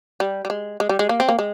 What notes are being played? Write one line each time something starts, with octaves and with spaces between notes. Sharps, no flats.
G3
G3
G#3
G#3
G3
G#3
A#3
C4
A#3
G#3